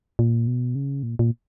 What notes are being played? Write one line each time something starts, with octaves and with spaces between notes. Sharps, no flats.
A#2
B2
C#3
A#2
A#2